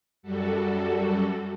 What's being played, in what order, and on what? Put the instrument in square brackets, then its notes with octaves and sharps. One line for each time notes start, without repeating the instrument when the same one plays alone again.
[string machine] F#2 G3 F#4 A4